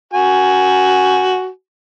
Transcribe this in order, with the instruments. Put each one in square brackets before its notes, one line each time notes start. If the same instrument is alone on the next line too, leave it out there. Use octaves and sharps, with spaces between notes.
[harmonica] F#4 G#5